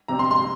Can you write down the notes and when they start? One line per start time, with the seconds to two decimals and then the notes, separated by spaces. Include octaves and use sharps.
0.08 C3 G3 C4 A#5
0.19 C6
0.31 C6